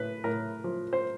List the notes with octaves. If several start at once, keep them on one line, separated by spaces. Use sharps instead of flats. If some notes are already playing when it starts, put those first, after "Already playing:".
Already playing: A2 B4
A2 A#4
F3
C5